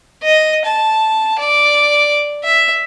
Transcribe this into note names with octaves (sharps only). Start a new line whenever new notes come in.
D#5
A5
D5
E5